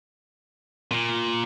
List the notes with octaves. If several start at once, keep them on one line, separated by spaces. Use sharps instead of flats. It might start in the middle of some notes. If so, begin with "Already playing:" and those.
A#2